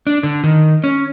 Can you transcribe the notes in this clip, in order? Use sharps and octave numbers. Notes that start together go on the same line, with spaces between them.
D4
D3
D#3
C#4